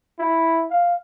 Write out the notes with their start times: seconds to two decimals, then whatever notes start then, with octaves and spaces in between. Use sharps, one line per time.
0.19 E4
0.70 F5